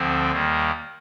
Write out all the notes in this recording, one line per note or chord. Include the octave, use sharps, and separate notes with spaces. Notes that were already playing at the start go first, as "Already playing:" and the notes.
Already playing: D2 D3 F3 C4
D#2 D#3 G3 A#3